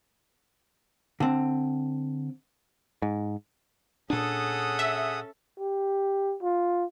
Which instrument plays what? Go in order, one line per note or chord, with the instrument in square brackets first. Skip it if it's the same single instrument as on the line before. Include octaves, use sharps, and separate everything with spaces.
[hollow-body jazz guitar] D3 C4
[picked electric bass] G#2
[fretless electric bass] A#2 D4 [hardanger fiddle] C#4 A4 [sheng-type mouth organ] G#4 F#5 D#6
[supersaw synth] E5
[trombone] G4
F4